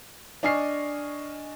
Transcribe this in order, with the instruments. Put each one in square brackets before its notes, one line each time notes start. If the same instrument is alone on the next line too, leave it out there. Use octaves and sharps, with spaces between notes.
[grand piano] D4 D#5 G#5 C#6 F6 C7